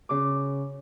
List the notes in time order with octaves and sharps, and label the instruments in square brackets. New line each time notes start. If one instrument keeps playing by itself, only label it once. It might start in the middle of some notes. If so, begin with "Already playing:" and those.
[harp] C#3 D6